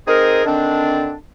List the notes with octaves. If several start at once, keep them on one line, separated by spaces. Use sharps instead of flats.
C4 D#4 G#4 A#4
D3 D#3 C4 D4